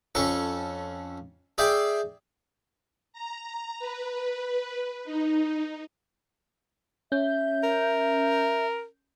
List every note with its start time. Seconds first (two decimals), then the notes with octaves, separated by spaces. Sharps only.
0.15 F2 C#4 A4 C#6
1.58 G#4 D5 E5 G5 C6
3.13 A#5
3.79 B4
5.05 D#4
7.12 C#4 E5 G6
7.63 A#4